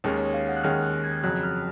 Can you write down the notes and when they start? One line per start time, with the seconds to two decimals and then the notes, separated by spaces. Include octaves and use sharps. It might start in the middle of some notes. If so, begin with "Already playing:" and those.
0.04 D#2 D#3 G#3 C#4 C#5
0.19 C#5
0.34 F5
0.48 F#5
0.57 F#6
0.63 D#2 D#3 G#3 C#4 F6
0.84 F#6
1.04 G#6
1.23 F2 C#3 F#3 F#6
1.43 F6